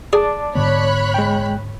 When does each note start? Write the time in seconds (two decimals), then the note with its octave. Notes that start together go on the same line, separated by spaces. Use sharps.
0.13 G#4 D5 A5 D6
0.55 G#2 D3 B3 C#5 B5 F#6
1.14 G#3 G5